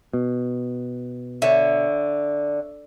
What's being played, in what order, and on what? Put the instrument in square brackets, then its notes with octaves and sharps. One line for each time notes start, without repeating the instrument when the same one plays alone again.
[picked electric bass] B2
[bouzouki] D3 [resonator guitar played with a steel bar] C#5 E5